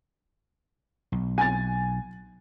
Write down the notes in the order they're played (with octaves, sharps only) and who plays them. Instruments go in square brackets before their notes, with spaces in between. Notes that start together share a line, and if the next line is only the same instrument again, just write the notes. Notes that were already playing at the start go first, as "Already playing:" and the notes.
[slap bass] B1
[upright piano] G#5 A6